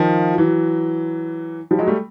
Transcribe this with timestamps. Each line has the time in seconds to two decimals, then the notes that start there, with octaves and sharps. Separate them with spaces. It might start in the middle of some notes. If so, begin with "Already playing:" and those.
Already playing: D#3 F3
0.38 E3 F#3
1.71 F3 G3
1.79 F#3 G#3
1.88 G3 A3